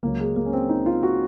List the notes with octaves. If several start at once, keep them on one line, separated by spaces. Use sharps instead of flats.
C#2 C#3 F#3 A#3
G#3
A#3
C#4
C4
D#4
F4
F#4